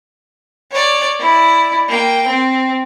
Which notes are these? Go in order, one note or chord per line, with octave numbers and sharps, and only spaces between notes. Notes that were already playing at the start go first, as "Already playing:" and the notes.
C#5 D5
E4 D5
A#3 G5
C4